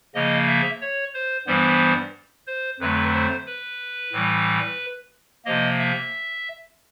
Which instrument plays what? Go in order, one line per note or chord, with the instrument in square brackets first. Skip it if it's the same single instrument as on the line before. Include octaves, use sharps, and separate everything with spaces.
[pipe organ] C#3 F3 A#3 D#5
E5
C#5
C5
G2 E3 G3 B3 C5
C5
F2 D3 F#3 A3 B4
C5
B4
A2 E3 G3
C3 F3 A#3 D#5
E5